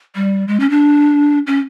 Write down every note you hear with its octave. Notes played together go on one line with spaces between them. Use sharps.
G3
G#3
C#4
D4
C#4